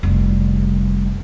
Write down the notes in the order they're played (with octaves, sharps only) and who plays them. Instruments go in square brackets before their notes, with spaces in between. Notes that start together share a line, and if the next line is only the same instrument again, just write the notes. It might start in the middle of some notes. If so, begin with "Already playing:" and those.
[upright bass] F1 G3